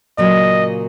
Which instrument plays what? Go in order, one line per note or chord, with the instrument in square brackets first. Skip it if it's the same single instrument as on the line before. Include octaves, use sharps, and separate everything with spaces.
[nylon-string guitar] A#2 C#3 F#3 [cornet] D#5